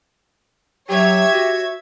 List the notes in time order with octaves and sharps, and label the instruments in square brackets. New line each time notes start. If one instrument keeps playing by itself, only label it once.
[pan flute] F#3 [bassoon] G4 [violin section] C#5 E5 G#6
[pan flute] F#4